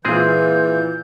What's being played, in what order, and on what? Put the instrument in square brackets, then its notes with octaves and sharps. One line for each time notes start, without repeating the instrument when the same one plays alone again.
[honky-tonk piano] A#2 F4 [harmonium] E3 [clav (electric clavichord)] G#3 C4 G#4 [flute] G6